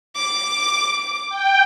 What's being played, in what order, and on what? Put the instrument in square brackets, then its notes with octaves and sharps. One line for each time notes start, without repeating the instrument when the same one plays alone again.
[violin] D6
[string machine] G5